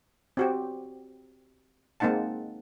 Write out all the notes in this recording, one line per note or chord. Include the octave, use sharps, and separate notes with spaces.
C4 F#4 G4
G#3 A#3 C4 D#4 F#5 A5